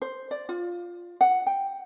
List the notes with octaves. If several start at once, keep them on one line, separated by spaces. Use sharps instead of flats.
C5
D5
F4
F#5
G5